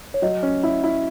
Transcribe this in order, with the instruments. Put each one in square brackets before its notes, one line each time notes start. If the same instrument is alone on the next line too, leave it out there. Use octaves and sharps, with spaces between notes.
[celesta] C#5
[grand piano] F#3 [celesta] D#5
[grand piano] C#4
E4
E4